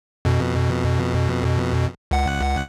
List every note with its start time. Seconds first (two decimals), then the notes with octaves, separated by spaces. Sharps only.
0.25 F2 B2
2.11 C#2 F#5